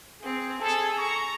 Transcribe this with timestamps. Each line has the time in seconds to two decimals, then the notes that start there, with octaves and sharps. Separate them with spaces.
0.21 C4 G#4
0.60 G#4 A4 G#5
0.97 A#5 C#6